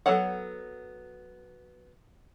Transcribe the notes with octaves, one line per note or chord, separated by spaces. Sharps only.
F#3 B3 A4 C#5 F#5